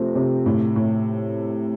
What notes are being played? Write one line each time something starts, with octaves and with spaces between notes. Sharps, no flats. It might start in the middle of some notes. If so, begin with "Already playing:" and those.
Already playing: C3 F3 A3 C4
C3
A2
A2